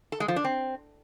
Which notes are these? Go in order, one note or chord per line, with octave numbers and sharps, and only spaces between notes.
A4
G#3
F3
D4
C4